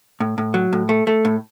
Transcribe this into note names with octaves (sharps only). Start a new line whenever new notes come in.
A2
A2
F#3
A2
A3
A3
A2